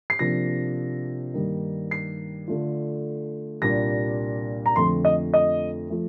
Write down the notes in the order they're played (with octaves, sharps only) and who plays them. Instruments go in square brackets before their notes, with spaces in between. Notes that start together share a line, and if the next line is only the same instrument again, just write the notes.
[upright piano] C7
C3 F3 A#3 D4 A#6
G2 D#3 G3 A#3 D#4
C7
D3 A3 D4 F4
C2 A#2 G3 A#3 D4 A#6
A#5
F2 D3 F3 A3 C6
D#5
D#5
F3 A3